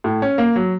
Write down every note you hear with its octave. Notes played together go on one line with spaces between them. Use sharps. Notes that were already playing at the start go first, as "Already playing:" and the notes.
A2
C#4
A#3
F#3